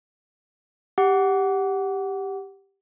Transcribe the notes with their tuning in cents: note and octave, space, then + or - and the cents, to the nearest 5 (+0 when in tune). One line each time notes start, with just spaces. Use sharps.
G4 +0 F#5 +10 D6 -25